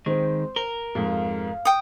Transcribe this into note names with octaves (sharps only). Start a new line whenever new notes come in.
D#3 G#3 C4 C5
A#4 G7
F2 G#2 F5
G5 D#6